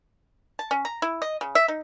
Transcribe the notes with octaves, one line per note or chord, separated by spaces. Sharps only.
A5
C#4
A#5
E4
D#5
C#3
E5
D#4